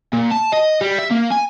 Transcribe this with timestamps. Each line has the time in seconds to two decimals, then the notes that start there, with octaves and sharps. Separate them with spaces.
0.13 A#2
0.32 A5
0.53 D#5
0.81 G3
0.98 E5
1.10 A#3
1.31 G#5